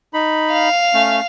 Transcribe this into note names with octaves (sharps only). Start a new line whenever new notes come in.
D#4 B5
F5
A3 C#4